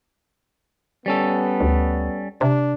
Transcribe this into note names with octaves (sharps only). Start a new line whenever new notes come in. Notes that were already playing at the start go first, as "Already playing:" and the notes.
G3 B3 C#4 A4
D2
C3 D4